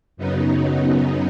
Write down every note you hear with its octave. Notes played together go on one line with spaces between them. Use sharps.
F#2 C#3 F#3 B3 D#4